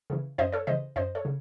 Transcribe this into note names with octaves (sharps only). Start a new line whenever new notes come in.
C#3 E3
F#2 C5 D#5
A4 C#5
C#3 E3 C5 D#5
F#2 C5 D#5
A4 C#5
C#3